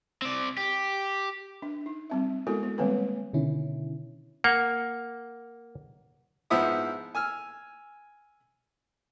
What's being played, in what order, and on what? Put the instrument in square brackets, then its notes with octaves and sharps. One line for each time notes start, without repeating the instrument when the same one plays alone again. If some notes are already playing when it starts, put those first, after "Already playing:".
[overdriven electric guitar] C4 D5
G4
[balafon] D4
D#4
G3 C4 E5
G#3 B3 E4 F#4 A4 A#4
B3
D#3 G3 G#3 A#3 C4 B4
[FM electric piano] B2 D3 D#3 C#4 E4
[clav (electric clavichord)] A#3 [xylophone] F#5
[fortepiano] G#2 F3 B3 E4 E5 D#6
G#5 E6 F6